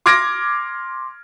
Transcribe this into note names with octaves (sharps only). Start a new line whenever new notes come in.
C6 D6 F6 G#6 A#6 D7